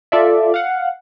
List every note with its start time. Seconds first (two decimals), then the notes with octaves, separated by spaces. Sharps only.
0.12 F4 A4 D5 E5
0.54 F5 F#5